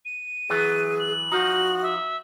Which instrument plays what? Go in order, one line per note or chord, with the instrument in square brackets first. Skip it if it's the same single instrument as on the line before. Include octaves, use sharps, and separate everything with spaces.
[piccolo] D#7
[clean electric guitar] E3 F#3 B3 [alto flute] G#4
[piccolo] F#7
[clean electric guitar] F3 D#4 [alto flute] F#4
[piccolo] E5